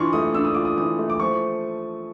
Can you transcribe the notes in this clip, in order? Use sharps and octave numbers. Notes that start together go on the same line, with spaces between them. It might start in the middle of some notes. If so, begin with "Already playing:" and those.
Already playing: E3 D4 F4 C6 C#6
A3 D#6
D4 E6
D#6
F4 D6
D#6
E3 D#6
A3
D6
F3 C#6